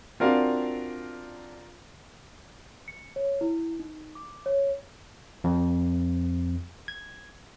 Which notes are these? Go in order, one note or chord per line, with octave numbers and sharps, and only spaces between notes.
C4 D4 F4 F#4 A#4 F5
C#7
C#5
E4
D#4
D6
C#5
F2
G#6